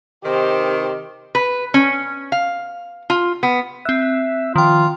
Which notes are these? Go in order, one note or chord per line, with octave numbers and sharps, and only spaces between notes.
C3 D#3 G4 C5
B4
C#4
F5
F4
B3
C4 E5 F#6
D#3 F3 F4 G5